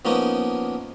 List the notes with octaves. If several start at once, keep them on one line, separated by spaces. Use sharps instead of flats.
F3 A#3 B3 C#4 D#4